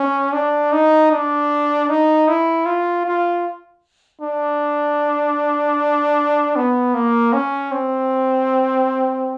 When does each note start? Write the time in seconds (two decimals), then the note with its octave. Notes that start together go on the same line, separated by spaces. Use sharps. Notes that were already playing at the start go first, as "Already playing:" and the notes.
Already playing: C#4
0.33 D4
0.72 D#4
1.11 D4
1.89 D#4
2.28 E4
2.66 F4
3.05 F4
4.22 D4
6.56 B3
6.94 A#3
7.33 C#4
7.72 C4